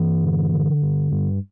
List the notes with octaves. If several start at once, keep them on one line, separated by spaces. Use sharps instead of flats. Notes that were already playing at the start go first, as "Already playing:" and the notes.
Already playing: G2 E3
D3
D3
G2
G2